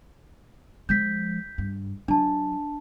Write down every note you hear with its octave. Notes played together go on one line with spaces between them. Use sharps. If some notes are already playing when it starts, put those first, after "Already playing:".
F3 G#3 G6 B6
G2
F#3 D4 A5